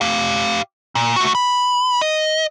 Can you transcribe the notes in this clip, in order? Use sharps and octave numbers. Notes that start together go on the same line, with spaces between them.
G4 F5
A#2
A3 F#4
B5
D#5